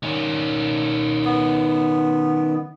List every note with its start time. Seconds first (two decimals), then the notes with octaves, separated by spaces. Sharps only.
0.03 D#3 C#4
1.25 B3